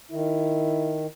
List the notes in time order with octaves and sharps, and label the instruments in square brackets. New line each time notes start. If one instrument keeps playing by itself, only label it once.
[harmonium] D#3 [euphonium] E4